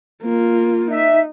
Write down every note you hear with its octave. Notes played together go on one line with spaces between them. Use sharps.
A#3 F4
D#4 E5